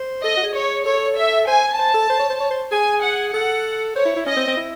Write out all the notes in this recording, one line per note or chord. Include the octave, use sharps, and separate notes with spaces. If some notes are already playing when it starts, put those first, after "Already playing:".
Already playing: C5
A4 D#5
F#4
G#4
C#5
A4 C#5
E5
C5 G#5
C5 A5
A4
C5
C#5
C5
C#5
C5
G#4 G#5
F#5
A4 F#5
C5 C#5
E4
E4
C#4 D#5
C4
C4
E4